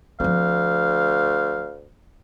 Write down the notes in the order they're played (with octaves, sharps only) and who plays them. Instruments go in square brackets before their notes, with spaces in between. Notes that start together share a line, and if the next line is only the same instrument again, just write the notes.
[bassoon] D2 [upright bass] F3 C4 [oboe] F5